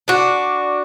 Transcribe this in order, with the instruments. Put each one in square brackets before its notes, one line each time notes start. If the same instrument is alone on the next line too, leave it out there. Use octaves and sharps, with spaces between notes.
[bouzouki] D4 F#4